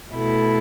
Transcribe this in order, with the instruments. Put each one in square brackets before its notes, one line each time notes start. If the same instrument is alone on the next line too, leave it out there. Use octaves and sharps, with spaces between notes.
[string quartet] B2 A3 E4 A4